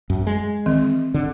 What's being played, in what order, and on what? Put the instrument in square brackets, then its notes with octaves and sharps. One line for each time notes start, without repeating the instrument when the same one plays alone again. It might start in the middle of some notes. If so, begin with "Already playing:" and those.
[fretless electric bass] F#2
G#3
[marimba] D#3 E3 C4
[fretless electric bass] D3